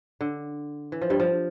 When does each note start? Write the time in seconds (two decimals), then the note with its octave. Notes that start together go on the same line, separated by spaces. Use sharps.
0.21 D3
0.92 E3
1.02 F3
1.10 G2 G3
1.20 F3